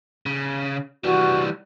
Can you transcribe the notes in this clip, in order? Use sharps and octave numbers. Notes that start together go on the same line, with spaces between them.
C#3
E3 G3 F#4